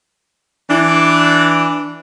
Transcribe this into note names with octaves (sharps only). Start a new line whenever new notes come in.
E3 D4